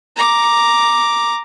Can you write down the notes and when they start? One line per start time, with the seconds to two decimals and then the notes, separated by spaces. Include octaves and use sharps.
0.16 A#5 D6